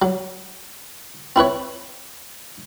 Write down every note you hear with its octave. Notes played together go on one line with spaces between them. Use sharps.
F#3
C4 E4 B4 C#5